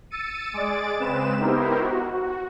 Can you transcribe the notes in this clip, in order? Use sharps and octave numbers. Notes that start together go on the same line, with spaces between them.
E6 A6 C#7 D#7
G#3 G#4 D5 A6 D7
C#3 G#3 C4 B4 E7
B3 D#4 E4 G4 A#4 C5
F#4
F#4